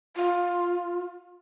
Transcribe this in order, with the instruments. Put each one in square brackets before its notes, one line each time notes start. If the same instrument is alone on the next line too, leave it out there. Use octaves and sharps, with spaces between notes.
[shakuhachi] F4